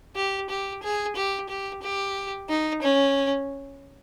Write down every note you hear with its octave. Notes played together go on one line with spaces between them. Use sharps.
G4
G4
G#4
G4
G4
G4
D#4
C#4